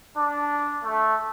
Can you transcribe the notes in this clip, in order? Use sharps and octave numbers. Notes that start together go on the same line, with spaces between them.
D4
A3